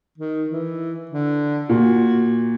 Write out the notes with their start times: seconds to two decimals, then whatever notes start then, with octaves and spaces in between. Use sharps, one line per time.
0.18 D#3
0.50 E3
1.11 D3
1.69 A#2 F#4